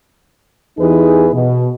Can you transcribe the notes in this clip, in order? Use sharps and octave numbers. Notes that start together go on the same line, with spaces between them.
E2 E3 D#4 G4 G#4 B4
B2